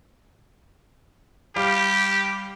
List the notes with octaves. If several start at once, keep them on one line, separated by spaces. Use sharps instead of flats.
G3 G4 F5 D6